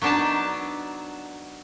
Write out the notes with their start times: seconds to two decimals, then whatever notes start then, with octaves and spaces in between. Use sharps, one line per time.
0.02 F#3 B3 D4 D#4 A5